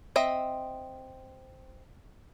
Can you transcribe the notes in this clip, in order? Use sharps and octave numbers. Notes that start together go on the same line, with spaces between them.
C4 D#5 E5